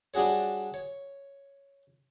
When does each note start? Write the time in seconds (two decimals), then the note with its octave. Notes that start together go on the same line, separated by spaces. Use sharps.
0.14 G3 D4 F#4 G#4 C#5
0.74 C#5